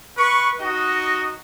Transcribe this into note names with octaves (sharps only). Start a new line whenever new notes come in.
B4 C#6
D#4 F#4 D#5